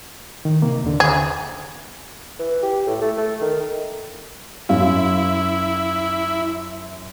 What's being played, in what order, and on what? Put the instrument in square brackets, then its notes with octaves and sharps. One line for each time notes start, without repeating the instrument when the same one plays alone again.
[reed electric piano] D#3
C3 A#3
D#2 D3
[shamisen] G#4
[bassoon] E3
G4
A2
A3
A3
D#3
[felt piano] F#2 F5 [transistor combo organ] E4